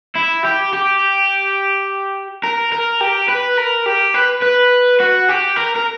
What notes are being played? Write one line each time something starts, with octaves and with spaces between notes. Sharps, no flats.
E4
G4
G4
A#4
A#4
G4
B4
A#4
G4
B4
B4
F#4
G4
A#4
A#4